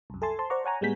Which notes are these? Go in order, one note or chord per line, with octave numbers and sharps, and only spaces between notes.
C2 F#2
A4 E5 G#5 A5 C6 A6
C5 A5 C6
C5 D5 F#5 A#5 C#6
C#5 F#5 G#5 A#5
A2 G3 G#3 B3 G6 B6